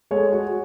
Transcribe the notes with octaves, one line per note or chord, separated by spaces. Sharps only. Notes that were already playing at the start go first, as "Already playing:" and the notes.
G#3 A4 C#5
F#4